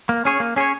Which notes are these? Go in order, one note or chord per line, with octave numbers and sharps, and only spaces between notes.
A#3
C#4 G#4 C#5
A#3
C#4 G#4 C#5